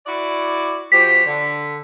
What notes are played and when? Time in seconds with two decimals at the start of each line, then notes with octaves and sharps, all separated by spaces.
0.06 E4 F#4 D5
0.92 F3 F#4 G4 B6
1.25 D3